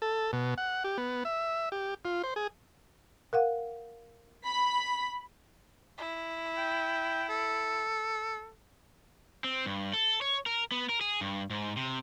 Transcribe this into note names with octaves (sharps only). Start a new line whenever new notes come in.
A4
B2
F#5
G4
B3
E5
G4
F4
C5
G#4
A#4 F5 F#5
B5 B6
E4
G5
A4
C4
G2
A4
C#5
A#4
B3
A#4
G#4
G2
G#2
C3